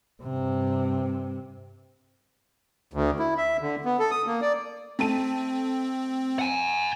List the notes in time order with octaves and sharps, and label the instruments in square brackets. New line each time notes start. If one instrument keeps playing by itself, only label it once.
[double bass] G2 C3
[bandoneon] D2
E4
E5
D3
B3
A4
D#6
A#3
D5
[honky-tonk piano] A3 A5 D#7 [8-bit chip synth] C4
[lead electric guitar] F#5 G#5